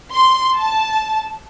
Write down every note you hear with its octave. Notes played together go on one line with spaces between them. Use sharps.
C6
A5